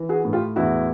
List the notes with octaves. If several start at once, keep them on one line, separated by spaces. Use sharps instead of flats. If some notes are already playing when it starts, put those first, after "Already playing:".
Already playing: E3
F#4 G#4
A2
F4 G4
E2 E4 F#4